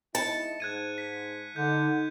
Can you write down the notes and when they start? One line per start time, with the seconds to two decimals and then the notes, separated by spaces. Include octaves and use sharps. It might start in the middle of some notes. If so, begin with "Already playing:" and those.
0.15 G#2 E4 D#5 A5 C#7
0.60 G#2 F#6 G#6 D#7
0.98 B6
1.56 D3 D#4 G6